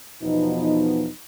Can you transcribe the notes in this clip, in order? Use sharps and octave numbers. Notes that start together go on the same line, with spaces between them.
E2 B2 F3 B3 D#4